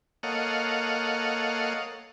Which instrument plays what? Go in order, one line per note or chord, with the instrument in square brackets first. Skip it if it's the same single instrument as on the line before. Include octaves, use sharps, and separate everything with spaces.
[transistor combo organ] A#3 A4 C#5 D#5 F5 F#5